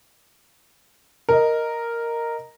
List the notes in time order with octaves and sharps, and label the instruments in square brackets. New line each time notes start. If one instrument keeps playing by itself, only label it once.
[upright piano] A#4 D#5